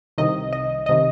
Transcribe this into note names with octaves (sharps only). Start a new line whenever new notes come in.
C2 C3 D#3 D#5
D#5
D#5
C3 D#3